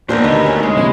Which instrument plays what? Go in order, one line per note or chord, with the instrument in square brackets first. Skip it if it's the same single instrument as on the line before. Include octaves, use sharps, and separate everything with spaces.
[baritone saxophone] D#2 [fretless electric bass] A#2 [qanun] B3 D4 G4 [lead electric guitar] A#4 C5
[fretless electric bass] D2 [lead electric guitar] D3 B3 [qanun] D#4
[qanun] C#4
[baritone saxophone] D#2 [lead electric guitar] G#3 [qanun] A#3
[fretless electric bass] A#1 C3 [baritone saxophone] E4